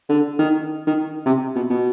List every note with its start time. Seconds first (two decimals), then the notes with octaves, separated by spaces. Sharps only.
0.09 D3
0.39 D#3
0.87 D#3
1.26 C3
1.55 B2
1.70 B2